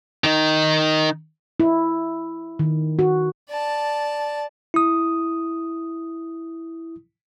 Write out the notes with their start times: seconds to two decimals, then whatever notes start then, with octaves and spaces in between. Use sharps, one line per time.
0.24 D#3 D#4
1.60 E4
2.59 D#3
2.99 F#4
3.50 D5 A5
4.74 E4 D#6